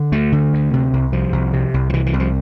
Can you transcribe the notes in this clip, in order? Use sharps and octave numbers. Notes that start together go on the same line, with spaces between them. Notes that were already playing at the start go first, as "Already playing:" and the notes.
Already playing: D3
D2 A3
D3
D2
C3
C2
C3 F3
C2
C3
C2
F3
C3 E3
E3
C2
F3